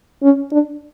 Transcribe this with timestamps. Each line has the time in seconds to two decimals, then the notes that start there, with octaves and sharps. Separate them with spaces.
0.23 C#4
0.52 D4